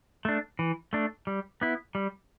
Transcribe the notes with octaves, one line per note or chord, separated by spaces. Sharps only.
A3 D4
E3
A3 D4
G3
B3 E4
G3